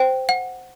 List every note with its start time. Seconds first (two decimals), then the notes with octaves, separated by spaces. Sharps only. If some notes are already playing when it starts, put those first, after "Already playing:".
Already playing: C5 G5
0.29 F#5